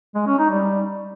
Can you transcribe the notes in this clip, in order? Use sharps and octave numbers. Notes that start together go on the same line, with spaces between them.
G#3
C#4
D#4
G3